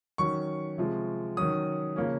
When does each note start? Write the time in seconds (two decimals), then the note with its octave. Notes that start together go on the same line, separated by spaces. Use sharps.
0.18 D#3 F#3 C#4 C#6
0.78 C3 F3 G#3
1.37 D#3 F#3 C#4 D#6
1.96 C#3 F3 A#3 C#4